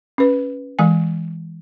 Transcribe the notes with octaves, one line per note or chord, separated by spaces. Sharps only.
C#4 B4
E3 G#3 G#5